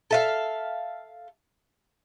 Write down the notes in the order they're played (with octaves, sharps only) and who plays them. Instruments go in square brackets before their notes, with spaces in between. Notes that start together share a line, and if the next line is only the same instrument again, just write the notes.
[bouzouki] A4 E5 F5